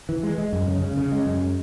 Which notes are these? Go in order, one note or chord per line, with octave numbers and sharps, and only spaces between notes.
E3
G#3
G#3
F#2
C#3
C#3
C#3
G#3
F#2